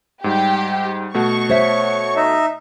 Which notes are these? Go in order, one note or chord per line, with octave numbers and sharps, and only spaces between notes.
G#2 G3 G4
B2 A3 F#4 C#6
C5 C#5 E5 F5
D#4 E5